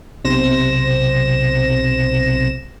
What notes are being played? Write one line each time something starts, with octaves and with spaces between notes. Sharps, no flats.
B1 C3 C5 A#6 E7